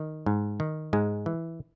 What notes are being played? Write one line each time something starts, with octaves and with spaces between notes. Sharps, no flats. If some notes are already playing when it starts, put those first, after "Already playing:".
Already playing: D#3
G#2
D#3
G#2 G#3
E3